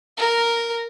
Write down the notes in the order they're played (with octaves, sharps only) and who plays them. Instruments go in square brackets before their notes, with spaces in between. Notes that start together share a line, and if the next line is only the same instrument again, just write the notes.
[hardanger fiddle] A#4